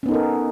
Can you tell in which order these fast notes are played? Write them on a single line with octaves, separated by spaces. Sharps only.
C#4 B3 D#4 A4 A#4